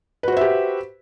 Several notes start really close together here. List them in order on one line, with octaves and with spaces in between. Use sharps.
B4 F#4 C5 E5 G4